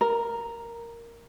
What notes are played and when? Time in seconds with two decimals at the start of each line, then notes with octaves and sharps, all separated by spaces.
0.01 A#4